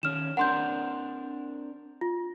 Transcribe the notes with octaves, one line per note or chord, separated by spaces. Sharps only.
D#3 C#4 F6 E7
C4 D4 A#4 F#5 C6 G6
F4